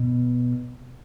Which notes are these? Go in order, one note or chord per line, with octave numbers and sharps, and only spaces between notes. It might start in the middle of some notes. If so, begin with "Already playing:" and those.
Already playing: B2